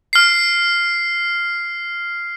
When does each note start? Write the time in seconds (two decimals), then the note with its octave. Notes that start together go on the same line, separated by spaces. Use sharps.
0.13 F6 C7